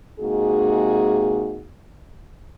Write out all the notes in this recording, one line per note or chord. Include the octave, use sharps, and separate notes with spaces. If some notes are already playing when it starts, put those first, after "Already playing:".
C3 G#3 A#3 D#4 F#4 G#4